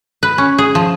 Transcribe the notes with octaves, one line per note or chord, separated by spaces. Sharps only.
B4
C#4
G#4
F3